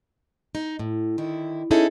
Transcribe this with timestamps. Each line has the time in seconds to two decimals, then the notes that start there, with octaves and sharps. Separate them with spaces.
0.55 D#4
0.79 A2
1.18 D3 D#3 E4
1.71 C#4 D#4 E4 G#4 A4